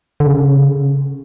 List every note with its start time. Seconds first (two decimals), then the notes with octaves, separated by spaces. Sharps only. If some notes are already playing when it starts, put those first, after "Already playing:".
0.20 D3
0.27 C#3